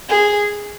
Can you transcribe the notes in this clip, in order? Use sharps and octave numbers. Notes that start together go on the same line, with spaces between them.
G#4